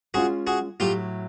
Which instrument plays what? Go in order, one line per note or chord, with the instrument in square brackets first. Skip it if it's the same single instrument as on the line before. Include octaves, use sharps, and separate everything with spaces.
[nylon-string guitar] G#3 C#4 F4 [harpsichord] F#4 G#4
[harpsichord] F#4 G#4
[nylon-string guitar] A2 F#3 A3 [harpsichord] F4 G4